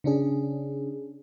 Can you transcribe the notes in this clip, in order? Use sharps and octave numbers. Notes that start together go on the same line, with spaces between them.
C#3 C#4 D4 G#4